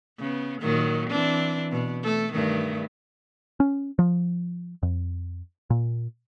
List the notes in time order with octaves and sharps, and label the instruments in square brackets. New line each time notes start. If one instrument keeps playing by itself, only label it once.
[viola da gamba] C#3 B3
A#2 D#3 F#3
E3 C4 D4
B2
A3 A4
G2 D#3 A3
[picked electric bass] C#4
F3
F2
A#2